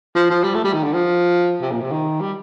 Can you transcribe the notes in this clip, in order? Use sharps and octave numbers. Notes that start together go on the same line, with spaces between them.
F3
F3
G3
A3
G3
D#3
D3
F3
C3
A#2
C3
D#3
G3